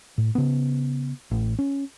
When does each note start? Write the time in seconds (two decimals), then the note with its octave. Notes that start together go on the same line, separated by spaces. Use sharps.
0.18 A2
0.35 C#3 B3
1.31 A1
1.59 C#4